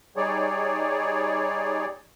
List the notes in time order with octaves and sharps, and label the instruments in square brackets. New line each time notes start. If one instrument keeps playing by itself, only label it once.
[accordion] G3 D#4 G#4 C#5 D5